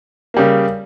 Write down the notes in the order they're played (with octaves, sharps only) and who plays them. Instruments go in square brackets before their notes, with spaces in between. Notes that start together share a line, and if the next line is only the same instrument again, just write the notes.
[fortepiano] C#3 G3 A#3